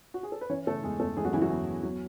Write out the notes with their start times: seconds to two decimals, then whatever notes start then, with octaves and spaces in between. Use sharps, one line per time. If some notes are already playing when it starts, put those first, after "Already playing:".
0.14 F#4
0.23 G#4
0.32 A4
0.41 B4
0.50 E3 C#4 C#5
0.67 C#3 A3 A4
0.83 E2 G#3 G#4
1.00 E2 A3 A4
1.17 E3 G#3 G#4
1.25 F#3 F#4
1.33 C#3 E3 E4
1.42 F#3 F#4
1.50 E2
1.67 E2
1.83 F#3